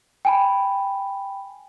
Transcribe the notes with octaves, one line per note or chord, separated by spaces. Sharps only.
G5 G#5 B5